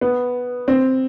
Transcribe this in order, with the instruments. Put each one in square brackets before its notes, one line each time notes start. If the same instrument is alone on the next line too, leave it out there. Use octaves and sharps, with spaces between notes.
[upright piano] B3
C4